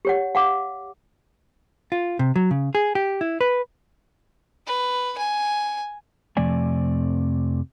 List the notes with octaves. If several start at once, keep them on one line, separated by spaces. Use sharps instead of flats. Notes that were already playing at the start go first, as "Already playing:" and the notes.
G4 C#5 F#5
F5 F#5 D6
F4
C3
F#3
C#3
G#4
G4
E4
B4
B4
G#5
F2 C3 F3 A3 D5 G#5